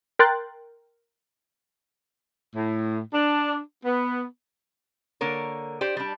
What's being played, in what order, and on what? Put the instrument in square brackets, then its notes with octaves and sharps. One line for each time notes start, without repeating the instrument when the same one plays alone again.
[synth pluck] A#4 G5 C6 F#6 A6
[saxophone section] A2
D4
B3
[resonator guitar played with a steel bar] D3 A#3 A#4 C#5
G4 C5 D5
G3 D4